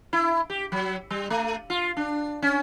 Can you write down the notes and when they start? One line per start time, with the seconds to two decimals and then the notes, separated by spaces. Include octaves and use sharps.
0.13 E4
0.50 G4
0.72 F#3
1.11 G3
1.30 A3
1.70 F4
1.97 D4
2.42 C#4